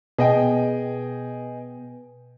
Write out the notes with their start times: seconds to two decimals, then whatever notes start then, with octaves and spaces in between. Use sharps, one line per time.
0.19 B2 G#4 D#5 G5